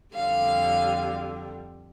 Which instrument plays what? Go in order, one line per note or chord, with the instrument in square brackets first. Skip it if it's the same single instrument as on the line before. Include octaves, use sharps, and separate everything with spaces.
[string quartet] F2 D3 G3 [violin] F5